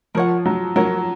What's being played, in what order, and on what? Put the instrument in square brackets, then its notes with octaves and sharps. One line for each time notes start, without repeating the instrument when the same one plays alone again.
[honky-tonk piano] F3 [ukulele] A#4 C#5 F#5
[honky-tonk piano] F#3
[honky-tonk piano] F#3 [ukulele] A#4 C#5 F#5